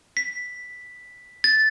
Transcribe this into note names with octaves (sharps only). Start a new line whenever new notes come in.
B6
A6